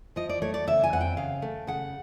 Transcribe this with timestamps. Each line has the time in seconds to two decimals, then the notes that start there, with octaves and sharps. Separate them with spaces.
0.16 F3 D#5
0.29 D5
0.42 A3 C#5
0.54 D5
0.67 C#3 E5
0.84 G#5
0.93 F2 F#5
1.01 G5
1.17 C#3 F5
1.42 A3
1.67 C#3 F#5